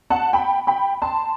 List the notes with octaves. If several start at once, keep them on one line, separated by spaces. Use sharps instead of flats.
F#5 A5
G5 B5
G5 B5
A5 C6